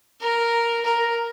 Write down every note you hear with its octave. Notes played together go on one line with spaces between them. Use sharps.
A#4
A#4